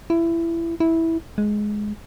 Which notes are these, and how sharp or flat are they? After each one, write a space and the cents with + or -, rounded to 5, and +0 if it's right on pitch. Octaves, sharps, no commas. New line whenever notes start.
E4 +20
E4 -10
G#3 +10